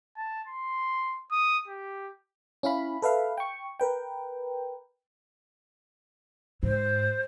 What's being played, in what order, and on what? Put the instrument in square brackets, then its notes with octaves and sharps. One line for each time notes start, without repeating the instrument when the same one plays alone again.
[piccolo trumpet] A5
C6
D#6
G4
[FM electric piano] C#4 E4 F5 B5
A4 B4 E5 F5
G5 C#6
A#4 B4 G5
[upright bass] G#2 [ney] C5